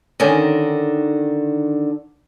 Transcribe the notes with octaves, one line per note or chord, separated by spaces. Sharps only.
D3 D#3 C#4